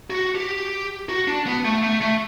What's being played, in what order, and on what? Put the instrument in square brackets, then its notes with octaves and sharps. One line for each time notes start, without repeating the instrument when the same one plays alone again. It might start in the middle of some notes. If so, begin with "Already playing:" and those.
[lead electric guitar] F#4
G4
F#4
D4
B3
A3
A3
A3